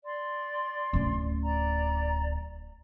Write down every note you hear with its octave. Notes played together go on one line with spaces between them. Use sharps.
D5 C6
D1 C#4
D5 A#5